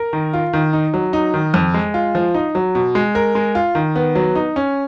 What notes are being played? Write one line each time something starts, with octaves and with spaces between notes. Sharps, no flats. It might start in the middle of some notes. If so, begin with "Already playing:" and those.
Already playing: A#4
D#3
F4
D#3
D#4
F#3
D#4
D#3
F2
G#3
F4
F3
D#4
F#3
B2
G#3
A#4
G#3
F4
D#3
B3
F#3
D#4
C#4